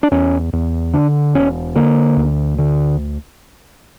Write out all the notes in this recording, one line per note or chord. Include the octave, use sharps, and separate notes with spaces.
D4
E2 C#4
E2
D3 D4
E1 C#4
D3 A#3
D2
D3